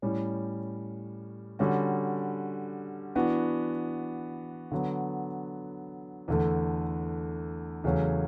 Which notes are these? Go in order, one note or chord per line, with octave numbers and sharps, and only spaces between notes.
A2 G3 C#4
D3 G3 C#4 F#4
E3 B3 D4 F#4
D3 F#3 B3
E2 D3 A3
E2 C#3 F#3 A3 C#4